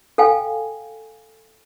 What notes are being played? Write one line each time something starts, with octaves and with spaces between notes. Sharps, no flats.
A4 F5 G5 G#5